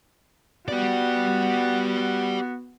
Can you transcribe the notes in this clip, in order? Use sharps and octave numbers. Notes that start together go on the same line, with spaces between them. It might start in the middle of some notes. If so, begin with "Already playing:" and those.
B3 F#4 G4 D5